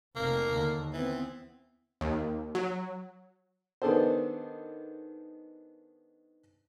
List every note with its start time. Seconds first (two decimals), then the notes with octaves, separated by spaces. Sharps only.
0.16 F1 A#3
0.52 D#2 D3
0.93 E3 B3 C4
2.01 D#2
2.55 F#3
3.82 D#3 B3 D4 G#4 A4 C5